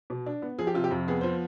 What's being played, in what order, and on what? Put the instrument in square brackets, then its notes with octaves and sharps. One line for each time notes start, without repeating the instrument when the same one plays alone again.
[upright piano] B2
D4
B3
F3 G#4
G4
C3 F4
G4
F2
B3 G#4
F3 C5